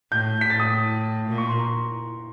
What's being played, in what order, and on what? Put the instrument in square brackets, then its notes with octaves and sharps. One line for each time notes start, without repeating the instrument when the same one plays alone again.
[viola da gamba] A2 [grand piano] G6
[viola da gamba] A2 [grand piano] B6
[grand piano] A6
D#6
[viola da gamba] A#2
[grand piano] C#6
C6
A#5